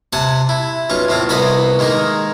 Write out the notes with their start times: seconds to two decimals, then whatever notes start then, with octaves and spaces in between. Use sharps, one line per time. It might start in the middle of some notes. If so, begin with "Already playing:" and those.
0.13 C3 F#5 G#5 A5
0.49 E4
0.90 B1 C#4 F4 C#6
1.08 A2 C4 F4
1.29 C2 B3 C5 D#5 G#5 B5
1.79 D#3 G#3 A#3 D#4